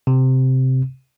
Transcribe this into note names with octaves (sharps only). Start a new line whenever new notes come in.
C3